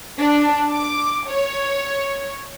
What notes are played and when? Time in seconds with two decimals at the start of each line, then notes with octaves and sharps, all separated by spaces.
0.19 D4
0.72 D6
1.29 C#5